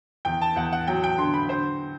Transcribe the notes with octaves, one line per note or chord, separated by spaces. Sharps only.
E2 G5
A5
E2 F#5
F#5
F#3 G5
G5
D3 C6
B5
D3 C5